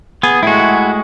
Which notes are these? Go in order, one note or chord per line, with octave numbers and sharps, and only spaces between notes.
B3 G#4
A2 G#3 E4 F#4